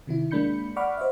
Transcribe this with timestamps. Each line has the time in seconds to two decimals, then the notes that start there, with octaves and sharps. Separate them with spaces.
0.07 C3 D#3 E4
0.31 G#3 A#3 D4 B5 G6 C#7
0.76 D5 F#5 B5 C#6 D6 F6
0.97 C5 D#5 E5